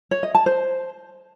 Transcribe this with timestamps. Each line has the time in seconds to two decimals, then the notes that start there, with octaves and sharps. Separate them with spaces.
0.11 C#5
0.23 D#5
0.35 A5
0.46 C5